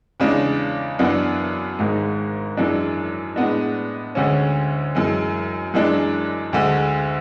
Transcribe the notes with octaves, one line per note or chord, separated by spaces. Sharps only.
E2 C#3 G#3 D4
F#2 E3 B3 D4
G#1 G#2 G#3
F#2 E3 G#3 D4
A2 G#3 B3 D4
D2 D3 G#3 C#4
F#2 E3 G#3
F#2 E3 G#3 D4
D2 D3 G#3